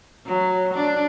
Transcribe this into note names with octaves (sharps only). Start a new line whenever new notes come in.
F#3
D4